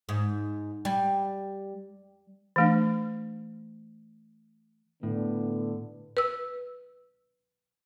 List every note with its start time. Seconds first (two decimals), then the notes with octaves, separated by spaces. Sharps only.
0.09 G#2
0.85 G3
2.56 E3 A3 D4
5.03 A2 D3 B3
6.17 B4 E6